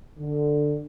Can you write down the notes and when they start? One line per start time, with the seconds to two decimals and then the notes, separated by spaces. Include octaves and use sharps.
0.19 D3